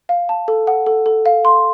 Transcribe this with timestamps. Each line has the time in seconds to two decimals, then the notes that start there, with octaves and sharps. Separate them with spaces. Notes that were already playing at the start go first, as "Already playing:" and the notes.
0.09 F5
0.29 A5
0.48 A4
0.67 F#5
0.86 A4
1.06 A4
1.26 F5
1.45 C6